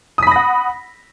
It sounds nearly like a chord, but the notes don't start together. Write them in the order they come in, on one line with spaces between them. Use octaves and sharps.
D#6 B6 B5 A#6 F#5